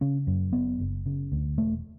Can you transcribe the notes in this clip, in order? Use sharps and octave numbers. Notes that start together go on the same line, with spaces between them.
C#3 C#4
F#2
F#1 B3
F#1
C#3
D2
E1 A3